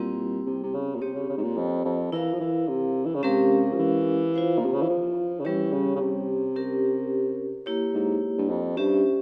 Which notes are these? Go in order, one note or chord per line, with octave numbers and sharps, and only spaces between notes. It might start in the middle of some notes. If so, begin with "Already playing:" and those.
Already playing: A#2 G3 C4 E4 G4
C3
C3
C#3
A#2
C3 C4 G4 C#5
C#3
C#3
G#2
A#2
F2
F2
E3 E4 A#4 F5
F3
E3
C3
E3
C#3
C3 G#3 C#4 G4 A#4 F5
F3
E3
F4 C5 F5
A#2
C3
C#3
E3
F3
C#3
E3 G3 C#4 G4 C#5
C#3
C#3
C3
C#4 G4 A#4
A#3 E4 G4 C#5
G#2
G2
F2
G2 C#4 G4 C5 E5